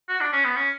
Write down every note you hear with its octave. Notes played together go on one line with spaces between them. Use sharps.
F#4
D4
C#4
B3
C#4